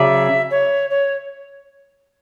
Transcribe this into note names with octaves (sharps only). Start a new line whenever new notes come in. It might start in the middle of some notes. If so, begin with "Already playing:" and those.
Already playing: C#3 F#3 C#4 G#4 D5 E5
C#5
C#5